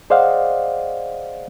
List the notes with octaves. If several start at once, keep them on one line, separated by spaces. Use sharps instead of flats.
G#4 C5 D5 D#5 F5 F#5